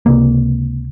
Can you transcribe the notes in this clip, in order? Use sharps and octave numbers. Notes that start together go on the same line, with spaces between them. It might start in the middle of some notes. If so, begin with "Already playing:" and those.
C#2 C3 A#3